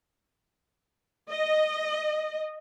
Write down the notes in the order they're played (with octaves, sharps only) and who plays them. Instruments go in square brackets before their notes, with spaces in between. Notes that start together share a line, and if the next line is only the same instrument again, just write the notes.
[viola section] D#5